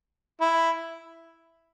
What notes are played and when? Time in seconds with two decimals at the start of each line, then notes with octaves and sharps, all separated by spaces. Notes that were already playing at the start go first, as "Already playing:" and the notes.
0.41 E4